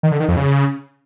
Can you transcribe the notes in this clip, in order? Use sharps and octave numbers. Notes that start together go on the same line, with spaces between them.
D#3
D3
D#3
F2
C#3